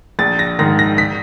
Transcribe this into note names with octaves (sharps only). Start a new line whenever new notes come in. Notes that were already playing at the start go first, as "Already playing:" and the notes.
A#1 A6
A#6
G#2 D#3 A#6
A#6
B6